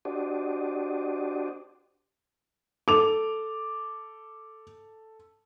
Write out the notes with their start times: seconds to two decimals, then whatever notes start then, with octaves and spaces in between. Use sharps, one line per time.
0.05 D4 F#4 G4 C5 D5 D#5
2.88 A4 D6 F7